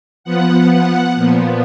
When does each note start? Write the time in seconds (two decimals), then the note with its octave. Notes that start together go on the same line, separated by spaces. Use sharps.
0.24 F3 B3 F#5
0.70 F#5
1.15 A#2 F3 B3